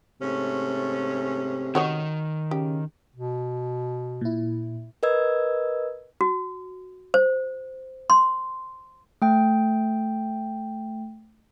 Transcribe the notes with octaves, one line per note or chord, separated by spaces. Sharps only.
G#2 C3 A3 C#4
D#3 F#4 C#5 D#5
C#3 G4
B2
A#2 E4
A#4 B4 D#5 E6 G#6
F#4
C5
C6
A3 G5